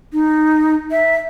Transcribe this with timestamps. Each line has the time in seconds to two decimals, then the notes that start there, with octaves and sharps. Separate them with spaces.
0.13 D#4
0.91 E5